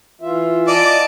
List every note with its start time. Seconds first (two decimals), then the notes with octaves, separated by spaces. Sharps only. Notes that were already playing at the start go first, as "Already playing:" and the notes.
0.22 E3 F4 E5
0.68 D5 D#5 A5 D7